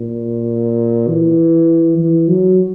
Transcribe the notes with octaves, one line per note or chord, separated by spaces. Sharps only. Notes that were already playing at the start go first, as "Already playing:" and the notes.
Already playing: A#2
E3
E3
F#3